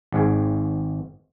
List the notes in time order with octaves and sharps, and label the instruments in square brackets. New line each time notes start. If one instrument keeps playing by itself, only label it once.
[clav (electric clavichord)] G#1 G#2 G#4